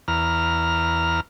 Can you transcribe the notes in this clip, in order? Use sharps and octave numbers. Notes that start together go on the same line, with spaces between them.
E2 A#5 F6